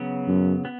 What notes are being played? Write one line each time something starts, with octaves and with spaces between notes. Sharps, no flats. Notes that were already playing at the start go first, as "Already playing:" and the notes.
Already playing: C#3 F#3 B3
F#2
B3